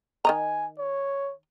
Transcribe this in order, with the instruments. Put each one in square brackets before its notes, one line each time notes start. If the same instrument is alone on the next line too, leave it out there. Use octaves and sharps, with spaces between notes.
[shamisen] D#3 D#5 A#5 [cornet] G#5
[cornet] C#5